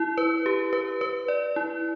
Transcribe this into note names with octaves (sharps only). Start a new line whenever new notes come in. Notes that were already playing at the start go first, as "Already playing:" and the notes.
Already playing: E4
B4
G4
B4
B4
D5
E4